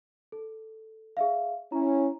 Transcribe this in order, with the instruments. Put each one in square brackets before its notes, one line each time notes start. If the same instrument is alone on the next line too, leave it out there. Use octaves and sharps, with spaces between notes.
[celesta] A4
G#4 E5 F5
[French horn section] C#4 E4 [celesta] A#5